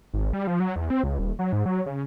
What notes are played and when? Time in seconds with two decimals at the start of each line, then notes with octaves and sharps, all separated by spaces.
0.13 G#1
0.33 G3
0.47 F3
0.60 F#3
0.76 E2
0.90 C4
1.04 C#2
1.19 D#1
1.39 F#3
1.52 G#2
1.66 F#3
1.86 C#3